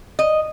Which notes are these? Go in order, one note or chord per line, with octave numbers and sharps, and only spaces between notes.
D#5